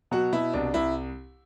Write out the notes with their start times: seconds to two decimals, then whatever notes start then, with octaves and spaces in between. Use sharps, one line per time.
0.11 B2 F#3 F#4
0.33 B2 E4
0.53 C2 D4
0.74 C2 E4